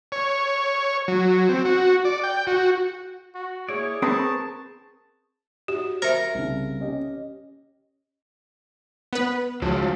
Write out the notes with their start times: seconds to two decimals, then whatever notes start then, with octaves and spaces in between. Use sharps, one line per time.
0.12 C#5
1.08 F#3
1.49 C4
1.65 F#4
2.05 D5
2.23 G5
2.47 F#4
3.35 F#4
3.69 A#3 E4 G#4 C#5 D5
4.02 C4 A#4 B4 A5 C#6 D#6
5.68 F#4 G4
6.02 A#4 C5 E5
6.35 C2 C#3
6.80 C#4 G4 D#5
9.13 B3 B4
9.62 C#2 F3 F4 F#4